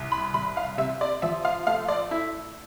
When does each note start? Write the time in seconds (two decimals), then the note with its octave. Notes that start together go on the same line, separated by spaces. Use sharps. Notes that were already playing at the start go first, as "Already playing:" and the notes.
Already playing: C2
0.12 B5
0.34 C2 B5
0.57 F5
0.78 C3 E5
1.01 D5
1.22 F3 E5
1.45 F5
1.67 A3 F5
1.88 D5
2.11 E4